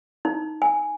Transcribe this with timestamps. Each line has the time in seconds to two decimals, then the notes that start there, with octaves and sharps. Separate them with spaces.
0.25 D#4
0.62 G#5